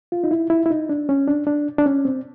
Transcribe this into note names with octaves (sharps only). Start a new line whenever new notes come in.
F4
D#4
E4
E4
E4
D#4
D4
C#4
D4
D4
D4
C#4
C4